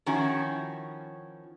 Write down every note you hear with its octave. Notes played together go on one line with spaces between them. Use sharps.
D#3 F3 C#4 E4 F#4